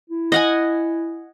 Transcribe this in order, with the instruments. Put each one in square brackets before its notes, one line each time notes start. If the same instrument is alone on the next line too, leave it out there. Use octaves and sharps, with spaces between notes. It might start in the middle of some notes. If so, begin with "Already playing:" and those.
[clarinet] E4
[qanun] D#5 F#5 G#5